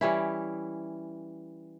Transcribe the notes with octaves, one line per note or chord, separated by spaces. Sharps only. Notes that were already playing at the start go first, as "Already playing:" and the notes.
E3 G3 C#4 E4